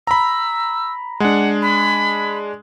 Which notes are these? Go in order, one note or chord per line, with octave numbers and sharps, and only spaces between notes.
A#5 B5 E6
G#3 D4 F#5
B5